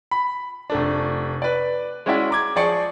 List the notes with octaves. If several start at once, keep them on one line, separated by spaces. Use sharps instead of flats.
B5
F1 A3 D4
B4 D5
G#3 C#4 E4 F#4 D5 E5
A#5 D6 G#6
F3 G#4 D5 C#6 C#7